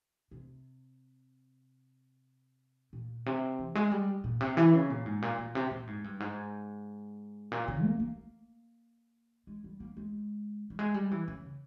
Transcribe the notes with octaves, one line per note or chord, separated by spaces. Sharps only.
C3
A#2
C3
E3
G#3
G3
A#2
C3
E3
C#3
A#2
G#2
A#2
A#2
C3
A#2
G#2
G2
G#2
A#2
C#3
A#3
A#3
G#3
G3
A#3
G#3
G3
G#3
G3
E3
C#3